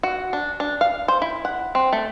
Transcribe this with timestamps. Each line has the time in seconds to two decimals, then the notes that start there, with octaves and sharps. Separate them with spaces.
0.03 F#4
0.33 D4
0.60 D4
0.81 F5
1.08 C5
1.22 E4
1.45 F#5
1.75 C4
1.93 A3